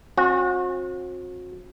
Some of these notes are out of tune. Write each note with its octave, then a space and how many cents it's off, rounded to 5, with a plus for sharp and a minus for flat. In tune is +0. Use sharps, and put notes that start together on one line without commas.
C4 +40 F#4 -35